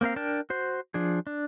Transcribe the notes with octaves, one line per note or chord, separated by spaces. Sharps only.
A#3 C4 A#4 F5
D4 A#4 G5 A5
F#4 C5
F3 D4 G#4
D4